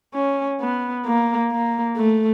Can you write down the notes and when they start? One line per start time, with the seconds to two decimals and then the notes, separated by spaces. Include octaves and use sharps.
0.14 C#4
0.61 B3
1.06 A#3
1.51 A#3
1.97 A3